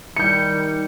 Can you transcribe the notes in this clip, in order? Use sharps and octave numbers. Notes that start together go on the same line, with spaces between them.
D#3 G3 G6 C#7